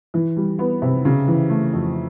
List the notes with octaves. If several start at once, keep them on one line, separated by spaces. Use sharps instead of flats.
E3
G3
B3
C3
C#3
E3
A3
F2